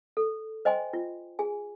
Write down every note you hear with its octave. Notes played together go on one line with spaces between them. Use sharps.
A4
C5 D#5 G5 G#5 C6
F4
G#4 G#5